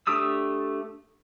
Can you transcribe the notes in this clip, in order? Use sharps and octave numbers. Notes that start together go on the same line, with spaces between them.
A3 D4 G4 D#6 E6